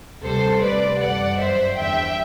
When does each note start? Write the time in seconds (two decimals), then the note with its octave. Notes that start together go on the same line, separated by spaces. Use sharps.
0.23 D2 C3 G3 A4 C5
0.61 D2 C3 G3 B4 D5
1.00 F#2 E3 G3 D5 F#5
1.38 G1 F#2 F#3 C5 E5
1.77 E2 D3 G3 E5 G5